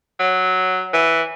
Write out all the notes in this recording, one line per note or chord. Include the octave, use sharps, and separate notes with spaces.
F#3
E3